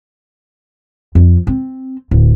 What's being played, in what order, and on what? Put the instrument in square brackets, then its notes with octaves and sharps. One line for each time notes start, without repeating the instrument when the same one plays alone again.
[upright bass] F2
C4
D1